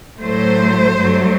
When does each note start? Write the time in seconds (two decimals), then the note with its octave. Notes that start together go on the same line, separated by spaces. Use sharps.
0.19 A2 F#3 A3 C5
0.98 G2 F#3 A3